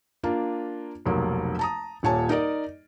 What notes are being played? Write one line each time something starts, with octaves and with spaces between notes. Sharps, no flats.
A#3 D4 F4
F1 B1 A#3
A5 A#5 D#6
D#1 A#2 C#5 G#5 A5
D#4 A#4 D5 D#5